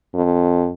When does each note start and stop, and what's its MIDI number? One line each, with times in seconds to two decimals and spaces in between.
0.15 0.70 41